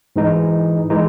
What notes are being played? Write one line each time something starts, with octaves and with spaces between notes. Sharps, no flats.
G#2 E3 G#3 D#4
E3 G#3 D#4